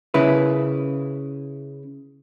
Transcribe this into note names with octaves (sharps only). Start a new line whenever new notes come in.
C#3 E4 B4